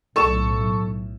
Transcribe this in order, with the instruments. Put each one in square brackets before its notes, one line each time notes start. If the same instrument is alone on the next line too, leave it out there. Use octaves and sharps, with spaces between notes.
[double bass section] B1 A2 [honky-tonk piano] A4 C#6 E7